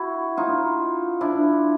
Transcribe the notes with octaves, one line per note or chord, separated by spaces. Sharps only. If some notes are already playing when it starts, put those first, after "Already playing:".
Already playing: E4 F#4
D#4 F4
D4 E4